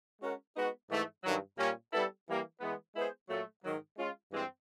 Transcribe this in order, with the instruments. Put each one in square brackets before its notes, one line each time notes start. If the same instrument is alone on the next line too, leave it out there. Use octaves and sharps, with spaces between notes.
[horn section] G#3 C#4 F#4 A#4
G#3 B3 D#4 F#4
G#2 E3 A3
G2 D#3 F#3
A#2 G3 A#3 C#4
G3 B3 E4 A4
E3 G3 A#3
E3 G#3 B3
G#3 B3 E4 G#4 C5
A#2 F#3 A3
G#2 D#3 F#3
G#3 C#4 F4
G2 E3 G#3 C4